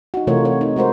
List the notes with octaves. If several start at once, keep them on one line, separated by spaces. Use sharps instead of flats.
D#4 F#4
C3 E3 A3 F4 A#4 C#5
C#5
D#4
G#3 F#4 A#4 C5